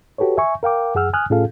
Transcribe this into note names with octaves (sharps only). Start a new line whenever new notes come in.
F#4 G4 A4 B4 C#5
E5 G#5 C#6
A#4 F5 G5 D6
F#2 G#4 F#5 E6 F6
G#5 D#6 F6 F#6
A2 C#4 F4 G#4 A4 F5